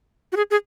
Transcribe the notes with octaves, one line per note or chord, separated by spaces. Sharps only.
F#4
G#4
G#4